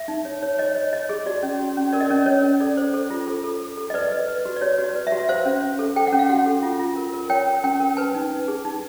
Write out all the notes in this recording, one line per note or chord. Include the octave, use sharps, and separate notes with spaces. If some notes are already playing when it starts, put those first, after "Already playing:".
Already playing: E5
D#4
C#5
C#5
C#5 D#5
C#5
C#5 D#5
G#4
F#4 D5
C#4
F#4
C#4
A#4 D5
D#5
C#4 D5
A#4 C#5
C#4
A4 D5
C5
A4
F4
A4
A4
A4
A4
D#5
B4 D5
B4
B4
F#4
D5
F#4 C#5
F#4
D5
B4
E5
F#4
E5
C5 F5
C#4
C5
A4
A4 G5
F#5
C#4
F5
F#4 F#5
A4
F4
F4
A#4
A#4
C#5 G5
A#4
C#4 G5
A#4
B4 G#5
D#4
D#4
G#4
D#4